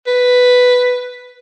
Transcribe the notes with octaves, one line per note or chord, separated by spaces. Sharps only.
B4